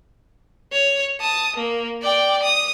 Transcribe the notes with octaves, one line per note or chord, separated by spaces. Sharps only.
C#5
A5 D#6
A#3
D5 G5
D#6